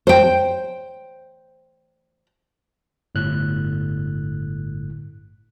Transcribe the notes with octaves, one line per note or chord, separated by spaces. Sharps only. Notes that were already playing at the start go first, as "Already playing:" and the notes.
C5 G5
G1 A2 F#6